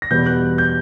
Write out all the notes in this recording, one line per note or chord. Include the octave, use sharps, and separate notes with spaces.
A#6
E2 B2 G3 B3 G6
F#6
G6